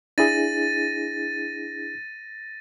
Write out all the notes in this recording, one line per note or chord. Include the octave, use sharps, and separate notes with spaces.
D4 E4 G#4 A6 A#6 D#7